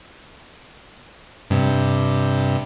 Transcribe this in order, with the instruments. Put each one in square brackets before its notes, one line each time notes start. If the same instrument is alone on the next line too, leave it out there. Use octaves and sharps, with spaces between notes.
[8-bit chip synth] G2 C3